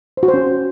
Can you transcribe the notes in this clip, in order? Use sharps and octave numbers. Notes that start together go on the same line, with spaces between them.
C5
F#4
C5
C#4